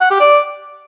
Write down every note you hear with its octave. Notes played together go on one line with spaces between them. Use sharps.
F#5
G4
D5